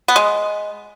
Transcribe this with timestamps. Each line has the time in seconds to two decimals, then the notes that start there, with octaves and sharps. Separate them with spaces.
0.08 B3
0.16 G#3